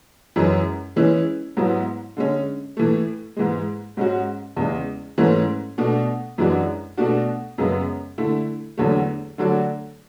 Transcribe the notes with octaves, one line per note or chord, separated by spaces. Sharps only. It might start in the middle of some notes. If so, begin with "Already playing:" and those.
F#2 E3 G#3 C#4
E3 G#3 C#4 E4
G#2 F#3 B3 E4
D3 G#3 C#4
A2 E3 A3
G#2 E3 G#3
G#2 G#3 C#4 F#4
E2 C#3 G#3
G#2 E3 A3 C#4
B2 A3 D4
F#2 E3 G#3 D4 F#4
B2 A3 D4 F#4
F#2 C#3 G#3 B3
D3 A3 E4
E2 D3 F#3 A3
D3 F#3 A3 D4 F#4